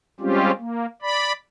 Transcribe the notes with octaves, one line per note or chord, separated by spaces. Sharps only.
G3 G#3 C4 C#4 F4 G4
A#3
D5 B5